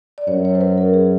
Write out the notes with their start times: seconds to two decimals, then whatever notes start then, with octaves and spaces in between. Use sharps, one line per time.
0.18 D5
0.27 F#2 C#5
0.45 C#5
0.55 C5
0.61 B4
0.78 A#4
0.94 G#4